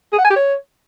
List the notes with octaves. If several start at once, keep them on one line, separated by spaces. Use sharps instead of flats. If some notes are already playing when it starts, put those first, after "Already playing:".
G#4
F#5
G#5
G4
C#5